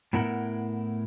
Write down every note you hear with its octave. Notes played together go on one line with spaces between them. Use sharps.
A2 B3 E4 A#4 F#5 G5